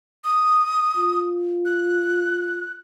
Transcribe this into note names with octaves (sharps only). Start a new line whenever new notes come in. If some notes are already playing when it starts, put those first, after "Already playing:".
D#6
F4
F#6